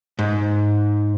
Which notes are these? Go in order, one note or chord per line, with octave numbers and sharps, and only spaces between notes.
G#2